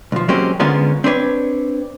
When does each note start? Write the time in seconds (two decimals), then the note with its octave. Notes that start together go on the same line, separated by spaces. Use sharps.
0.12 B1 F3
0.28 F#3 G#3 A#3 C4 C#4 G4
0.60 D3 G#3 B3 C#4 F4 A#4
1.04 C4 D4 B4 C#5